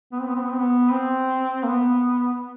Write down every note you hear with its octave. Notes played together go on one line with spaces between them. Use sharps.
B3
C4
B3
C4
B3
C4
B3
C4
A#3
B3